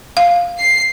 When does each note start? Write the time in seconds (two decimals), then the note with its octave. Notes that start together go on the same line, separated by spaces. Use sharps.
0.17 F5
0.58 C7